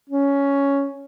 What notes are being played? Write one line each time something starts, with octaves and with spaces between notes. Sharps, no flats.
C#4